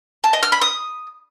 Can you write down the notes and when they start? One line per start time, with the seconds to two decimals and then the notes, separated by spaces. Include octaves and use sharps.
0.24 A5
0.33 D#5
0.43 F6
0.52 B5
0.62 D#6